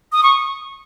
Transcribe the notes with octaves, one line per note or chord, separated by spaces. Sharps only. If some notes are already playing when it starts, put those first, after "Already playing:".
D#6
C#6